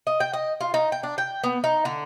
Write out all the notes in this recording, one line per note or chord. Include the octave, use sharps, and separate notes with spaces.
D#5
G5
D#5
F4
D#4
G5
D4
G5
B3
D#4
D3